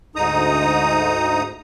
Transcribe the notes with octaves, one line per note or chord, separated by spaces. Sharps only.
D2 G#2 D#4 A#5 D#6